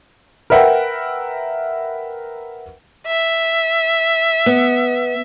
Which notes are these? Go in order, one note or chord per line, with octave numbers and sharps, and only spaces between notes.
A#4 B4 E5 F#5 G5
E5
B3